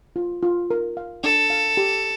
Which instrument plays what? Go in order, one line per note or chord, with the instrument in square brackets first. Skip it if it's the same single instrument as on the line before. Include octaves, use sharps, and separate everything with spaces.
[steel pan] F4
F4
A#4
F5
[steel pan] D4 [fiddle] A4
[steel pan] F5
G4